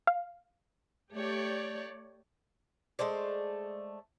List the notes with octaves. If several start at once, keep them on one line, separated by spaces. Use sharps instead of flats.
F5
A3 G4 C#5 D5
G#3 A3 C5 D5